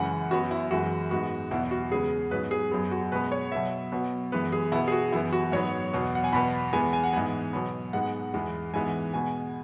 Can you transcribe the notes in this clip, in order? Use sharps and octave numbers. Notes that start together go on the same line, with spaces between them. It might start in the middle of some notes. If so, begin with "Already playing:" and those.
Already playing: F#2 C#3 E3 G#3 F#5
F#2 F#3 B3 F#4
E4
F#2 E3 G#3 F#4
G#2 G#3 B3 F#4
E2 B2 F#3 B3 E4
F#4
E2 C#3 G#3 B3 G#4
G#2 F#3 B3 B4
G#4
F#2 F#3 B3 G#4
F#4
B2 G#3 B3 B4
C#5
B2 F#3 B3 E5
B2 F#3 B3
F#2 E3 G#3 B3 B4
G#4
B2 B3 E4
G#4
F#4
F#2 E3 B3 E4
F#4
G#2 F#3 B3 C#5
E2 B2 F#3 B3
F#5
G#5
E2 B2 B3 B5
E2 E3 G#3 B3 G#5
G#5
F#5
G#2 E3 G#3 B3 G#5
B2 F#3 B3
G#2 G#3 B3 F#5
E2 E3 G#3 B3
G#2 E3 G#3 B3 G#5
B2 G#3 B3 G#5